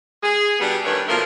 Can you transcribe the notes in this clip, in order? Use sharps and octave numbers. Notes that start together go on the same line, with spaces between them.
G#4
B2 G3 B3 D4 G4 G#4
G2 D#3 A3 D4 B4 C#5
B2 F3 A3 A#3 F4 A#4